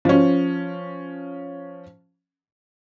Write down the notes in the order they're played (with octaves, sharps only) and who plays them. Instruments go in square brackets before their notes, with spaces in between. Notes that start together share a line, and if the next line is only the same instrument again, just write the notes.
[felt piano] F3 C#4